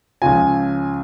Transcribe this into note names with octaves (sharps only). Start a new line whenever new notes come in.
C#2 C#3 F3 G#5